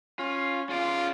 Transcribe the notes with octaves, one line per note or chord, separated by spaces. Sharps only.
C#4 F4
C#4 F4 G#4 D5